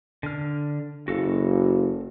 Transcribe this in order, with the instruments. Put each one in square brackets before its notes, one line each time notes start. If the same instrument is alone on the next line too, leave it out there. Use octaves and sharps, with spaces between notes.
[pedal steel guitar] D3 F6
[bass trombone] F#1 [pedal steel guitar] F#4 A4 F5